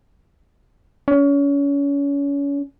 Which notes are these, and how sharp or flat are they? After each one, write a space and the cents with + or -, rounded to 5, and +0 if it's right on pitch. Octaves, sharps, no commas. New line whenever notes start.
C#4 +30